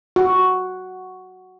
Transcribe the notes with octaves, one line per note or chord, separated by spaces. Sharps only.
F#4